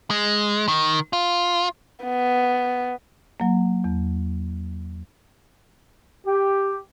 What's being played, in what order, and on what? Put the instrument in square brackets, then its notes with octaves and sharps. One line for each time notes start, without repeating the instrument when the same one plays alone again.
[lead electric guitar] G#3
D#3
F4
[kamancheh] B3
[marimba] F#3 A#3
E2
[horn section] G4